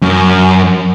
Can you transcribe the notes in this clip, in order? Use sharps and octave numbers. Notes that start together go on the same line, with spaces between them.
F#2